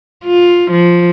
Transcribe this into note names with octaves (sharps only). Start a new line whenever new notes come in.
F4
F3